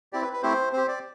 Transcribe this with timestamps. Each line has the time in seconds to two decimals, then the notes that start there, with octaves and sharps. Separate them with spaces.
0.13 C4 E4 G4 D5
0.22 B4
0.33 B4
0.43 A3 C4 E4 G4 C5
0.73 C4 G4 C5
0.88 D5